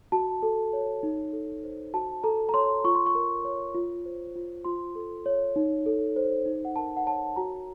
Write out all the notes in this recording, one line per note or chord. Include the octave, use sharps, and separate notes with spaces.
F#4 A5
A4
C#5
D#4
A4
C5
F#4 A5
A4 A#5
A#5
C#5 C6
F4 C#6
C6
C#6
A#4
C#5
F4
C5
F4
F4 C6
A4
C#5
D#4
A4
C5
D#4
F#5
A#4 A5
F#5
C#5 A5
F#4 A#5